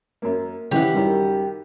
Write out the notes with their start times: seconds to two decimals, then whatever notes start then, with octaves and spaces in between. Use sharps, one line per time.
0.22 F#2 A#3
0.71 C#3 E3 G4 F#5
0.93 F#2 D#3 G3